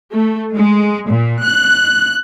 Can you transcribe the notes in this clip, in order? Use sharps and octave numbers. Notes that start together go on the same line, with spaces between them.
A3
G#3
A#2
F#6